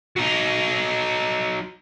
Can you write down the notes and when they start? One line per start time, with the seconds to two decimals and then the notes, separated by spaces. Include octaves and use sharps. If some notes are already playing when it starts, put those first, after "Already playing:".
0.16 F#3 D#4